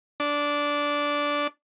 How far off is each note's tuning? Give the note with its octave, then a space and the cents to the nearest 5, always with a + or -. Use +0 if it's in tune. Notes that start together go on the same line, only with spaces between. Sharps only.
D4 -10